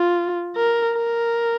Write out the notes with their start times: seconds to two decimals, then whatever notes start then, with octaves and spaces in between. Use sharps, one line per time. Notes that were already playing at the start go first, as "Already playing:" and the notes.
Already playing: F4
0.56 A#4
0.97 A#4